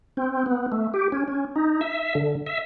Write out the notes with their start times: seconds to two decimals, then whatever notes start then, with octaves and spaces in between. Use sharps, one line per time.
0.17 C4
0.46 B3
0.72 A3
0.94 G4
1.12 C#4
1.28 C#4
1.56 D#4
1.81 E5
2.15 D3
2.46 E5